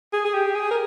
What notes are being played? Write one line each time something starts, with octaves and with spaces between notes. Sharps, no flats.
G#4
G#4
G4
G#4
A#4